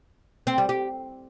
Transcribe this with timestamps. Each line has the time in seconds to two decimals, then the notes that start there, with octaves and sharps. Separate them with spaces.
0.47 C4
0.58 G3
0.69 G4